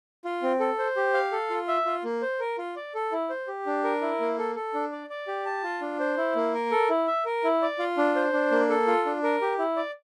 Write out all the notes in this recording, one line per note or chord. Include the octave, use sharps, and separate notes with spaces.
F4
C4
A4
C5
G4
F5
A4
F4
E5
F4
A#3
C5
A#4
F4
D5
A4
E4
C5
G4
D4
A#4
E4
A#3
A4
A4
D4
D5
D5
G4
A5
F4
D4
C5
E4
A#3
A#4
A4
E4
E5
A#4
E4
D5
F4
D4
C5
D4
A#3
A4
F4
D4
A#4
G4
E4
D5